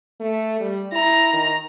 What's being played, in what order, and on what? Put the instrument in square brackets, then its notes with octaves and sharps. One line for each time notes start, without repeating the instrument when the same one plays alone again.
[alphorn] A3
G3
[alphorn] E4 [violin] A#5
[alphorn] D#3